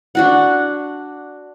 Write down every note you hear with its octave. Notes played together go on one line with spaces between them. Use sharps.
D4 F#4 F#5